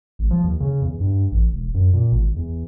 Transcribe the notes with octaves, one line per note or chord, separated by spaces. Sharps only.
G#1
F3
D#2
C#3
E2
G2
A1
E1
F#2
A#2
G#1
E2